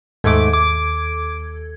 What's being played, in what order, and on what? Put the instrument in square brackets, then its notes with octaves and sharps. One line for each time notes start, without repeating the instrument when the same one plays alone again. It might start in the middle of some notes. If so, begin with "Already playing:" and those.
[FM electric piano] D#2 A4 G#6 [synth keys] G#2 A3 D6
[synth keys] D6